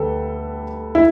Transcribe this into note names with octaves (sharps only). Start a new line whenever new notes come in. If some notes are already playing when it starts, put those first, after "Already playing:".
Already playing: D2 D3 G4 A4 B4
E4